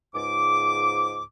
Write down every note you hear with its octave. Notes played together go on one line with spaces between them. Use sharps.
C#2 G#2 D6